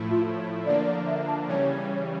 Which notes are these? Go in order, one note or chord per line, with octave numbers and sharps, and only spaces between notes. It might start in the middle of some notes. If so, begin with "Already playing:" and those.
Already playing: A2 F3 A3 E4
F4
C#5
D3 F3 A#3 D4 D5
D5
E5
A5
C#3 E3 G3 C#4 C#5